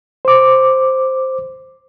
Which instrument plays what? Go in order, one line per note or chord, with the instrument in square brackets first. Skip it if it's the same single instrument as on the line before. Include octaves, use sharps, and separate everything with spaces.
[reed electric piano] C5 D6